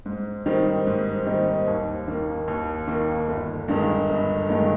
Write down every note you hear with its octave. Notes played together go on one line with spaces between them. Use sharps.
G#2
D#3 G3 C4 D#4
G#2
D#3 G3 C4 D#4
D#2
D#3 A#3
D#2
D#3 A#3
G1
G2 D#3 G#3 D#4
G1
G2 D#3 G#3 D#4